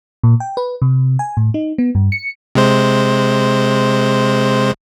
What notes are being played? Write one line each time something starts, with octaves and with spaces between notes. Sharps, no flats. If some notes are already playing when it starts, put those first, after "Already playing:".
A#2
G5
B4
C3
G#5
A2
D#4
B3
G2
C#7
C3 G#3 C5